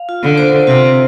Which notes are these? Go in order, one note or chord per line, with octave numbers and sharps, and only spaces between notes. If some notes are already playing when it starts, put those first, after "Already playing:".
Already playing: F5
F4
D3
C5
C3 F4